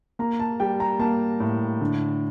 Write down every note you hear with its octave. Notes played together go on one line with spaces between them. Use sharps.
A#3 A#5
A5
G3 G5
A#5
A#3 A5
A2
D3